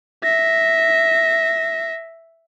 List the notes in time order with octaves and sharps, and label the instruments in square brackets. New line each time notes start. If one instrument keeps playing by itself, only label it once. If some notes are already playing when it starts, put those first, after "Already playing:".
[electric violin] E5 A#6